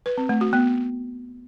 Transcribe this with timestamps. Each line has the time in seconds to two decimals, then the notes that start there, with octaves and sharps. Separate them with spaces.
0.06 B4
0.18 C4
0.29 A3
0.41 F#4
0.53 B3